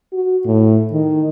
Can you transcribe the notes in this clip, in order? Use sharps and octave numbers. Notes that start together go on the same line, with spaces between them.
F#4
A2
D#3